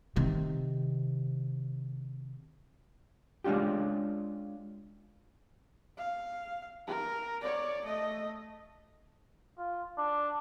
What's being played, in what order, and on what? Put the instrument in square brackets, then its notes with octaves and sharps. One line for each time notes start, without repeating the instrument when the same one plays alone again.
[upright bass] C3 D#3
[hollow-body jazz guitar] G#3 C#4 D4 F4 G4
[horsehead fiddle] F5
A#4
C#5 D5
A3 D#5
[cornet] F4
D4